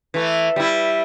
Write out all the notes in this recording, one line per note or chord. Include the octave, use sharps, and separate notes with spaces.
E3 A3
G3 E4